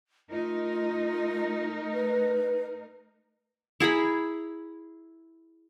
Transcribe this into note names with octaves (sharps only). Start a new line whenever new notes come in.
A3 D#4 F4 A#4
B4
E4 G#4 A#5 B5